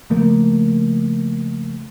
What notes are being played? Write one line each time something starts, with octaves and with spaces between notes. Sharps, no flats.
C#3 F3 A3 A#3